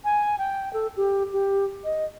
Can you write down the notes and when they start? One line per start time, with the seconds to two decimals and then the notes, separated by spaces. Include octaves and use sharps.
0.04 G#5
0.38 G5
0.73 A4
0.97 G4
1.33 G4
1.84 D#5